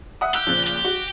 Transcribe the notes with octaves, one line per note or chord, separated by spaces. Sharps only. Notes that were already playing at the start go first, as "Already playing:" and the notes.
E5 F#5 D#6
G4 E6 F#6
A#2 C#3 F3
G4
F#4